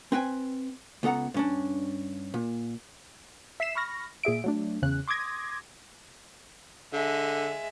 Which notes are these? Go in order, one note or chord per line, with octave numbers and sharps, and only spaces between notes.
C4 B4 G5 G#5
C#2 B3 A4 F#5 A#5
G2 C#4 D4
A#2
E5 B6 C7 E7
B5 C#6 F6 A#6
A#2 G#4 E5 D7
F#3 A3 D4
E2 C#3 F#6
C6 D6 D#6 G#6 A#6
D3 G#3 E5